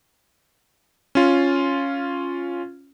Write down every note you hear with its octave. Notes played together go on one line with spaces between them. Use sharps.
C#4 F4